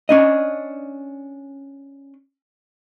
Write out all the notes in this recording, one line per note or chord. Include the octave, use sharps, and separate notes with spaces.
C#4 D4 D#5